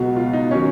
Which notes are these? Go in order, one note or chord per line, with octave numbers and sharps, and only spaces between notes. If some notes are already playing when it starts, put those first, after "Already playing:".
Already playing: C#2 B2 F#3 F#4
F4
D#4
D#3 F#3 C#4